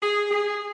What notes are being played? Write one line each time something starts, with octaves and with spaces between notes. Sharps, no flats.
G#4
G#4